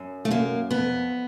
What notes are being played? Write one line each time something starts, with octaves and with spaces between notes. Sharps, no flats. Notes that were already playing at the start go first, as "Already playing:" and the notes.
Already playing: F#2
A3
F#2 A#3
F2 B3